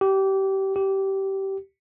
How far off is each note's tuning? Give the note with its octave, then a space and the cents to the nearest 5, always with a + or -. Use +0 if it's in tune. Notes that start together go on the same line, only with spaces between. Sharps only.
G4 -25
G4 -20